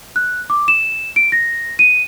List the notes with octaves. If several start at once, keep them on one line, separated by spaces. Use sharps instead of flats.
F#6
D6
E7
D7
A#6
D#7